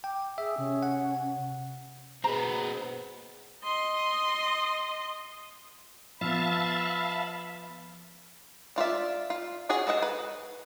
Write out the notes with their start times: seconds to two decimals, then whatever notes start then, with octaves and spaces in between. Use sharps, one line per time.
0.04 G5 D6
0.38 G#4 E5 D#6
0.58 C3 C#4
0.83 F#5
2.24 B2 C4 G#4 B4 A#5
3.64 D#5 C6
6.21 F3 B3 E5 F5 A5 B5
8.76 D4 F4 D5 E5
9.30 F4
9.69 F4 F#4 G#4 C#5
9.87 A4 B4 D#5 F#5 A5
10.02 B4